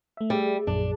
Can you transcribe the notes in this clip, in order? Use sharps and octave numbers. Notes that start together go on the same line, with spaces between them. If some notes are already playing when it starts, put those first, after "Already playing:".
A3 E5
G3 G#4
A#1 F#2 D4